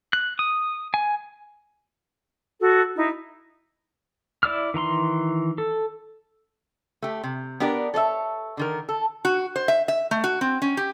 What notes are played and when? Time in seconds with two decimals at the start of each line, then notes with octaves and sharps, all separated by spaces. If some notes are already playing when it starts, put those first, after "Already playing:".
0.13 F#6
0.39 D#6
0.94 G#5
2.60 F#4 A4
2.96 D#4 E4
4.43 E4 D5 E6 F6
4.74 D#3 E3 A#5 C6
5.58 A4
7.02 A3 G4
7.24 C3
7.60 B3 D4 G4 A#4 D5
7.94 A4 C#5 D5 E5
8.57 D3 D#3 A#4
8.89 A4
9.25 F#4
9.56 C5
9.68 E5
9.88 E5
10.11 A3
10.24 F#4
10.41 C4
10.62 C#4
10.77 G4